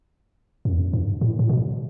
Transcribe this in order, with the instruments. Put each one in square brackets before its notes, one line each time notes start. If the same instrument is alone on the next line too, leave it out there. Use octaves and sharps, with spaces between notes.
[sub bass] F#2
E2
F#2
G2
A2
A2
B2